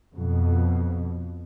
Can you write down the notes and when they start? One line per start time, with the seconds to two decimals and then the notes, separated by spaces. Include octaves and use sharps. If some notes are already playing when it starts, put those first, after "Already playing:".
0.15 F2 B2